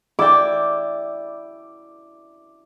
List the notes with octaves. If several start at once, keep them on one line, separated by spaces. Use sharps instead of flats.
E4 D5 G5 D6